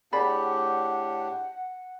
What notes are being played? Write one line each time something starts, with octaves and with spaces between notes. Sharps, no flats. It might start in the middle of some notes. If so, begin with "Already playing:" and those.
A2 D4 G4 G#4 D5 F#5 B5